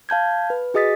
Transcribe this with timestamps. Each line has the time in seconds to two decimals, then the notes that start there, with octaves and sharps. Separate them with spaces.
0.09 F5 A5 G6 G#6
0.50 B4
0.74 F#4 G#4 D#5 D#6 A6 B6